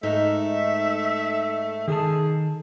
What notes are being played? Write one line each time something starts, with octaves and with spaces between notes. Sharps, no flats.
G#2 A3 D#4 A#4 E5
D#3 G#4 A4 A5